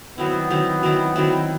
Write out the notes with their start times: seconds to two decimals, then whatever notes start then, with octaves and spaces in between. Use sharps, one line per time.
0.18 D#3 F#3 B3 C4 E4
0.50 D#3 F#3 C4 E4
0.83 D#3 F#3 C4 E4
1.16 D#3 F#3 C4 E4